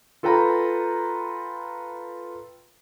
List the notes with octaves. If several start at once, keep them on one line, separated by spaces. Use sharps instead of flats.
F4 A4 B4 G5 A#5 B5